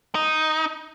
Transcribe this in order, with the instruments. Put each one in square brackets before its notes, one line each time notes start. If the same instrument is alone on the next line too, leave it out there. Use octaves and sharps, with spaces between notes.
[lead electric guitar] D#4